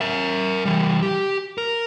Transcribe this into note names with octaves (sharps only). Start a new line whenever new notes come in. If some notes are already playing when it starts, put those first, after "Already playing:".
A#4 E5
E3 G3
G4
A#4